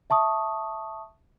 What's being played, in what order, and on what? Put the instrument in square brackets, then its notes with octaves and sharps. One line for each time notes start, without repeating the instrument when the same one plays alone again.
[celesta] E5 A5 C#6 D#6